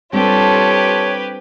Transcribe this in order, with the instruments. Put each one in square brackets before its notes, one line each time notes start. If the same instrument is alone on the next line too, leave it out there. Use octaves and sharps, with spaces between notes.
[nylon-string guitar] G3 C4 D4 [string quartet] F4 A4 [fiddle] G4 B4 [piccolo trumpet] C#5